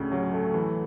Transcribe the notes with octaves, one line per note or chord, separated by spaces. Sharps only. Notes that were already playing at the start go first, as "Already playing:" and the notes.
Already playing: D2 A2 C#3
F#3
A3
E3